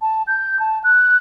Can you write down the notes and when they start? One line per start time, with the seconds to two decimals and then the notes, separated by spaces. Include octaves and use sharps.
0.02 A5
0.27 G6
0.59 A5
0.84 F#6